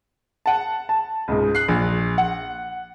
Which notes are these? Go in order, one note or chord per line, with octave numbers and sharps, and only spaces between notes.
F#5 A5
A5
C#2 G#2
F#6 C7
A#1
F#5